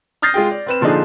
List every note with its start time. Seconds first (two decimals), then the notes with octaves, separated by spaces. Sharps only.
0.22 D#6 F6 G6 A6 A#6 C7
0.34 G#3 F4 G#4 G5
0.52 D5
0.67 C4 B4 E7
0.81 A#2 D3 F3 D4 D#4 G#4